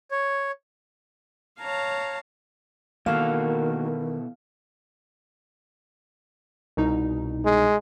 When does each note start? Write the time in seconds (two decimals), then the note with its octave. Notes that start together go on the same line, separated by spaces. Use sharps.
0.11 C#5
1.60 C#5 F5 A5 A#5
3.06 B2 D#3 E3 A#3 F#4 A4 F5
6.77 C2 B2 D#4
7.45 G#3